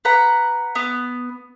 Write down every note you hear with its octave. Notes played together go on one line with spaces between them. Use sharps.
B4 F#5 A#5
B3